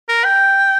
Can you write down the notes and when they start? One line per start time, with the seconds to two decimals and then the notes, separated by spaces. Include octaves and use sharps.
0.09 A#4
0.24 G5